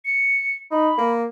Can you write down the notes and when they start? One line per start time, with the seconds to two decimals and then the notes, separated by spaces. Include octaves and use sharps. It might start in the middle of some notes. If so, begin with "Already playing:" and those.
0.05 C#7
0.71 D#4 B5
0.98 A#3